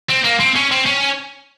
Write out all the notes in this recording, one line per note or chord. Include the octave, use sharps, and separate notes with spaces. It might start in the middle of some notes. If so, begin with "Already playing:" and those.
C4
A#3
C4
C#4
C4
C#4